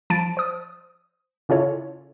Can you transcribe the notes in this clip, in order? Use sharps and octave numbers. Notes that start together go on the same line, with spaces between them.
F3 A5 A6 D7
C5 D#6
C#3 C#4 E4 F4 A4 C#5